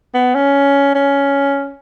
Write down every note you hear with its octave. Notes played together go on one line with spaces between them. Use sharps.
B3
C#4
C#4